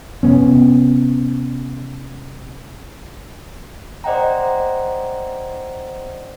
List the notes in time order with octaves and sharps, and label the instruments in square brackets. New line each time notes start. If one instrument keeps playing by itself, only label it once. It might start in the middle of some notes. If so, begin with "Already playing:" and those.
[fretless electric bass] C3 B3 C#4
[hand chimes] C5 D5 D#5 F#5 G5 A#5